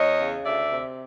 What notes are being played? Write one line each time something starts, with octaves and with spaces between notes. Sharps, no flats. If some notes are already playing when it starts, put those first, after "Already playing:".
Already playing: E2 C#5 D#5
C#3
D2 D5 E5
C3